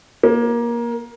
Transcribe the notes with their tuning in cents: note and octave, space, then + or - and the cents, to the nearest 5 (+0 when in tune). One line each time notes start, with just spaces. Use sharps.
A#3 +20